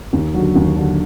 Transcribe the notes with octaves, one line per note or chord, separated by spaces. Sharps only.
D#2
D3 F#3
D#2
D3 F#3